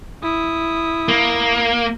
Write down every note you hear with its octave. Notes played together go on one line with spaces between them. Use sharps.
E4 D#6
A#3